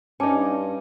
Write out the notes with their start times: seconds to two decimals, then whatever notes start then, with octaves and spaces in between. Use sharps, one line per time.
0.20 G2 C#4 D#4 G#5 A5 D6